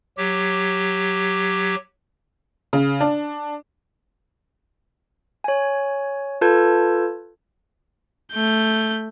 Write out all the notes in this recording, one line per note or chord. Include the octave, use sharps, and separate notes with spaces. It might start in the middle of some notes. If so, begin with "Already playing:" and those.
F#3 G4
C#3
D4
C#5 G#5
F4 A4 B4 A5 G6 G#6
A3 G6